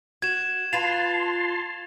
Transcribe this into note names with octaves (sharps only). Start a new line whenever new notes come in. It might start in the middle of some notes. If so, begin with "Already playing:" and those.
F#4 G#6 E7
F4 B4 A5 C6 F7